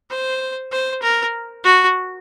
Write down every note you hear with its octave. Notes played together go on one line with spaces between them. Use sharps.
C5
C5
A#4
F#4